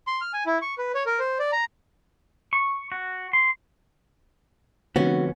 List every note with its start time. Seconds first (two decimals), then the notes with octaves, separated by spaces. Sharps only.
0.07 C6
0.21 F6
0.33 G#5
0.46 E4
0.62 C#6
0.78 B4
0.95 C#5
1.06 A#4
1.19 C5
1.39 D5
1.53 A#5
2.53 C#6
2.92 F#4
3.33 C6
4.96 F1 D3 E3 F3 B3 C#4 F#4